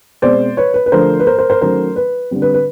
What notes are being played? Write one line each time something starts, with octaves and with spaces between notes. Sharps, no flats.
B2 G#3 C4 C5 D5
B4 C#5
B4
B4
D3 F3 A3 D4 A#4 C5
B4
A#4 C5
A#4 C5
A#4 C5
D#3 F#3 A3 C#4 A#4 C5
B4
D3 G3 C4
B4
B4